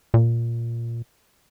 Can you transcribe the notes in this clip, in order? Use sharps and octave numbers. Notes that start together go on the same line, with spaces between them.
A#2